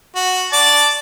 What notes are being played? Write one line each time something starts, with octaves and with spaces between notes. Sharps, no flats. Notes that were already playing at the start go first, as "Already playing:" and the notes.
F#4
D5 A5